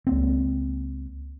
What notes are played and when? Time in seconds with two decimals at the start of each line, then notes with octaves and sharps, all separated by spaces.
0.07 C#2 A#3 C4